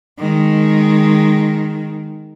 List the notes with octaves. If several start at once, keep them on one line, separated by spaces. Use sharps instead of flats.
D#3 G#3